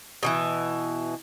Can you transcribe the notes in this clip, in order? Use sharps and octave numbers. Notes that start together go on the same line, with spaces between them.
B2 D#3 E3